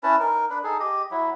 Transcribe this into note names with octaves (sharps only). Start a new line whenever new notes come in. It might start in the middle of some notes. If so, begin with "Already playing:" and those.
C#4 E4 B4 A5
D#4 A#4
D4 B4
D#4 G#4 A4
G4 D#5
F#3 E4